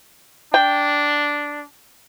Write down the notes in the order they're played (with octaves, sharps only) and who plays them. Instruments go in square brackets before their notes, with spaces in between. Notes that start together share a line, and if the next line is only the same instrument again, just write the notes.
[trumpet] D4 [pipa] G5